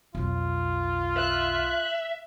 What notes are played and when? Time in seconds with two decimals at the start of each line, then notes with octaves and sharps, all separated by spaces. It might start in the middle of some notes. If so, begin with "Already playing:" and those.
0.15 B1 F2 F4
1.17 E5 F#6